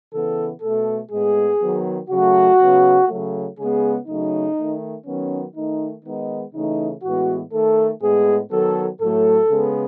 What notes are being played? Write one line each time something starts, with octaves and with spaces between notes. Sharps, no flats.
C#3 E3 B3 A4
B2 A3 A4
A2 G#3 B3 G#4
D#3 F#3 B3
C#3 F#3 A3 F#4
C#3 F#3 B3
C#3 F#3 A3
C#3 G#3 B3 G#4
C#3 F#3 A3 D#4
D#3 A3
D#3 F#3 B3 C#4
D#3 A3 D#4
D#3 G#3 B3 D#4
C#3 E3 A3 D#4
A2 E3 G#3 B3 F#4
D#3 A3 A4
A2 G#3 B3 G#4
D#3 F#3 B3 A4
A2 F#3 A3 A4
C#3 G#3 B3